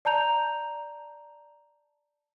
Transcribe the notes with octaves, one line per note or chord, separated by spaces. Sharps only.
D5 A5 A#5 G6 F7